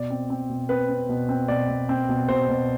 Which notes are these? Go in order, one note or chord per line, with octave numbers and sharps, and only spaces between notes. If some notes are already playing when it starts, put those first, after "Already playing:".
Already playing: B2 D5
C4
C4
B2
C4 B4
C4
B2
C4
B2 D5
B2
C4
B2
B2 C5
B2